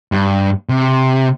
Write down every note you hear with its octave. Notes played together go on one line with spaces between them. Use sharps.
G2
C3